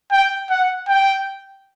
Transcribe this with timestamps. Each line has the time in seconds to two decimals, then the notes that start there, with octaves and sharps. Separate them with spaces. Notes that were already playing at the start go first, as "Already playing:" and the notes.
0.11 G5
0.50 F#5
0.88 G5